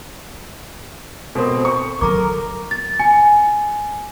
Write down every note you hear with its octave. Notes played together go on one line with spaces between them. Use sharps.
B2 C4 A4 A#4
C#6
D3 F#3 A4 A#4 A#5 D6
A6
G#5